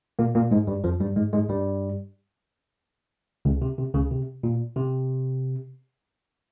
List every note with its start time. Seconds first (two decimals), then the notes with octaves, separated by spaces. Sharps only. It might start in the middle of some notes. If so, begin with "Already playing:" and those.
0.19 A#2 A#3
0.35 A#2 A#3
0.51 G#2 G#3
0.67 G2 G3
0.84 F2 F3
1.00 G2 G3
1.16 G#2 G#3
1.33 G#2 G#3
1.49 G2 G3
3.45 C#2 C#3
3.62 C3
3.78 C3
3.94 C#2 C#3
4.11 C3
4.43 A#2
4.76 C3